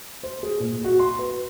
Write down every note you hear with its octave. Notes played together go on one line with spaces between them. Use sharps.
C5
G#4
A#2
F#4
C6
B4